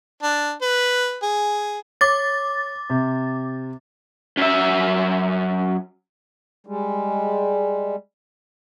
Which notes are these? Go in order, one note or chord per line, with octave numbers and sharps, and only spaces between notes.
D4
B4
G#4
C#5 D6 A6
C3
F#2 E5
G3 G#3